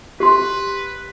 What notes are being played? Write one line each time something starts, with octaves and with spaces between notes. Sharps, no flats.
G4 B4 C6